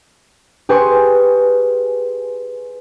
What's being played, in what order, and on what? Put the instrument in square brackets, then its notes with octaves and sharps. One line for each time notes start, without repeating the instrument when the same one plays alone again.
[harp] G4 G#4 B4 G#5 C6 C#6